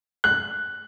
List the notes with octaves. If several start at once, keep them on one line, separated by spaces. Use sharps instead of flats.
F#6